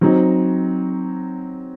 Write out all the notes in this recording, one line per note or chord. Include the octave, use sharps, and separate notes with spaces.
F#3 C4 D#4